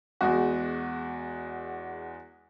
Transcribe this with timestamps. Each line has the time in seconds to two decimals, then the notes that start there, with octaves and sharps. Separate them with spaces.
0.21 E2 G#3 F#4